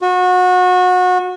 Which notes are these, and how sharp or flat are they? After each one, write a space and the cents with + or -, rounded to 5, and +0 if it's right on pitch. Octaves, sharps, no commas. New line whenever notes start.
F#4 -25